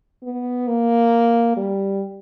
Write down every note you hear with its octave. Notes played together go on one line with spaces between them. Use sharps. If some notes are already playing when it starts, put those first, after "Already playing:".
B3
A#3
G3